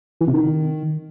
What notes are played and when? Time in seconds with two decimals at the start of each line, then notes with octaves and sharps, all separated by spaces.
0.21 E3
0.27 C3
0.34 D#3